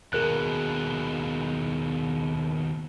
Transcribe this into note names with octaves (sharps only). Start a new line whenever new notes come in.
D#2 B2 G#4 A#4 F#6